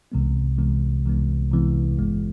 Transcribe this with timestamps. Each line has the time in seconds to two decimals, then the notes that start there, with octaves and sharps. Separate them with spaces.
0.12 C2 C3 E3 G#3 B3
0.58 C2 C3 E3 G#3 B3
1.05 C2 C3 E3 G#3 B3
1.51 C2 C3 E3 G#3 B3
1.98 G#1 G2 E3 G#3 B3